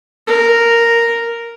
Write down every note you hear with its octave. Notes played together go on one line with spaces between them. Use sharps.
A#4